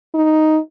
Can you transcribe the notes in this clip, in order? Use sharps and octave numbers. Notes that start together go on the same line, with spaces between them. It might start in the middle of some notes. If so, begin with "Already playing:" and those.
D#4